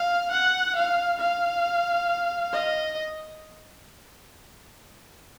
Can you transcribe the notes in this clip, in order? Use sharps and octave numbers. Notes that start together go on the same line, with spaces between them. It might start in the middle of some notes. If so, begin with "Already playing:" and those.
Already playing: F5
F#5
F5
F5
D#5